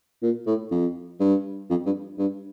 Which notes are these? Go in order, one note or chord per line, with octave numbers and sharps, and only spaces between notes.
A#2
A2
F2
G2
F2
G2
G2